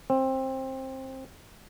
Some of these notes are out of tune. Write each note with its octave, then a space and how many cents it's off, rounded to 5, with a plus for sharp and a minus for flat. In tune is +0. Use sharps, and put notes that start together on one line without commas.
C4 +15